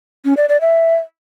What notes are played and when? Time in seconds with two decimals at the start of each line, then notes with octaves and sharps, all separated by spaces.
0.25 C#4
0.37 D5
0.49 D5
0.61 E5